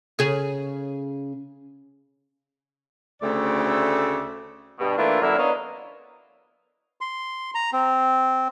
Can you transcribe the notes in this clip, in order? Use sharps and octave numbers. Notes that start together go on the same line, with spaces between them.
C#3 G#4
D2 C#3 A3 C4 D5 E5
G2 B2
E3 A3 A#3 D4 E4 F4
F#2 D3 F#3 A#3 D4 E4
B3 D4 A#4 C#5 D#5 F5
C6
A#5
C4